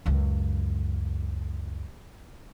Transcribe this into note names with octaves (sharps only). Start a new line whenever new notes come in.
C#2 F#2